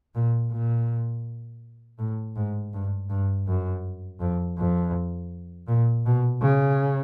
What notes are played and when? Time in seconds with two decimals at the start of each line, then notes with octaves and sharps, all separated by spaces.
0.15 A#2
0.51 A#2
1.99 A2
2.36 G#2
2.74 G2
3.10 G2
3.47 F#2
4.20 F2
4.58 F2
5.68 A#2
6.05 B2
6.42 C#3